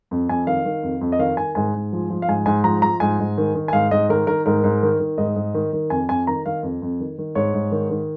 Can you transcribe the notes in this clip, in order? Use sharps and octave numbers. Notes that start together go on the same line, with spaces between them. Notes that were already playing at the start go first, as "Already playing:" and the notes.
F2
F2 G#5
D#3 F5
D#3
F2
F2
D#5
D#3 F5
D#3 G#5
G#2 G#5
G#2
F3
F3
F5
G#2 G#5
G#2 G#5
F3 A#5
F3 A#5
G#2 G#5
G#2
D#3
D#3
G#5
G#2 F5
G#2 D#5
D#3 A#4
D#3 A#4
G#2 A#4
G#2
D#3
D#3
G#2 D#5
G#2
D#3
D#3
F2 G#5
F2 G#5
D#3 A#5
D#3 F5
F2
F2
D#3
D#3
G#2 C#5
G#2
D#3
D#3